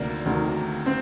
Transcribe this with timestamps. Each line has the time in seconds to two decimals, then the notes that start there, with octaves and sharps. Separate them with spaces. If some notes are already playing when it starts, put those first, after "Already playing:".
Already playing: D2 C3 D#3 A#3 D4
0.26 D2 C3 D#3
0.86 C4